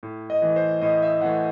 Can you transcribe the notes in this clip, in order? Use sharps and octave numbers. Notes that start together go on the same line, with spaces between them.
A2
D#5
E3 A3
C5
A2 D#5
E5
E3 A3 F#5